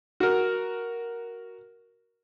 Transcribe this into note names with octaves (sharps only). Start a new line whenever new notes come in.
F#4 A#4